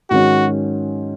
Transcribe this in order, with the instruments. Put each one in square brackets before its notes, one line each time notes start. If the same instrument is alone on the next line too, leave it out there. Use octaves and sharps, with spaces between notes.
[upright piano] G#2 D#3 F#3 C#4 [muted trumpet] F#4